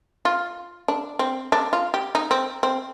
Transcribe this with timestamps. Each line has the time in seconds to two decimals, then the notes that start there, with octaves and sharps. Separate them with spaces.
0.25 F4
0.88 D4
1.19 C4
1.52 D4
1.73 F4
1.94 G4
2.15 D#4
2.31 C4
2.63 C4